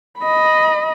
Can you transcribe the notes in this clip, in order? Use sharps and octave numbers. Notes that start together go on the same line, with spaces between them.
D#5 B5